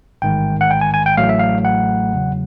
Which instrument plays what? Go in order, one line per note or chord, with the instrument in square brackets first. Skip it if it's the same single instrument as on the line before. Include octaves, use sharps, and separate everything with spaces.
[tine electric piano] A1 G#2 D#3 G#3 G5
F#5
G5
G#5
G#5
G5
A1 A2 F#3 A3 F5
E5
F5
F#5
E2 C#3 F#3